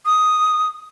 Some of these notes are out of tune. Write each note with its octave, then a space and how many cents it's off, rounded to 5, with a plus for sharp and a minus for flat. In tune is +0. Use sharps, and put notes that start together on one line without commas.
D#6 +5